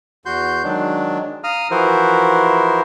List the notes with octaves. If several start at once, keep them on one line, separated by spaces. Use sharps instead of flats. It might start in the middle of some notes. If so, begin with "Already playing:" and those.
E2 F#4 C6 G6
D#3 F#3 G#3 D4
F5 A#5 D#6 F6
E3 F3 E4 F#4 A#4 C5